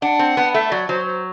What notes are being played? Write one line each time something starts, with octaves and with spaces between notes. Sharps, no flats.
D4 F#5
C4
B3
A3 E5
F#3 D5
F#3 C5
C5